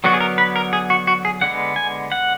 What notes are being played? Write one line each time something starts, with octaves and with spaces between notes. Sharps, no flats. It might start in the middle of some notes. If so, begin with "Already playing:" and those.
D3 F#3 B3 F#4
G#4
A#4
B4
A#4
G#4
F#4
F#4
G#4
D3 G#3 B3 F#5
G#5
F#5